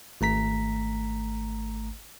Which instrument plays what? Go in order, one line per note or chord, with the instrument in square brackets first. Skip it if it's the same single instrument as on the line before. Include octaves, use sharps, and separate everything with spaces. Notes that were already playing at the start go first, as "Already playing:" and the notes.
[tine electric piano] G#1 A3 A#5 B6